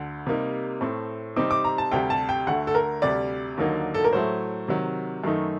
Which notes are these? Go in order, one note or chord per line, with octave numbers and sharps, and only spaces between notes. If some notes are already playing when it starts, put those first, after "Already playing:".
Already playing: D2 D3
C3 G3 A#3 D#4
A2 A3 C4
C3 G3 C4 D#4 D6
D6
A#5
A5
D2 C3 G3 G5
A5
G5
D2 D3 A3 F#5
A4
A#4
D2 C3 G3 D5
D#2 D3 F#3 A#3 D#4
A4
A#4
A2 F#3 A3 C5
C3 D#3 F#3
F#2 D#3 A3 D#4